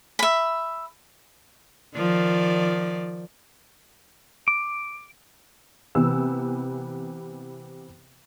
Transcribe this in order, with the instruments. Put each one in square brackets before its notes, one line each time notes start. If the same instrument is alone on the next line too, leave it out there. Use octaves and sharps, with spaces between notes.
[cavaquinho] E5 B5
[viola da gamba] D#3 F3 D5
[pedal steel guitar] D6
[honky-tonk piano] C3 E3 B3 E6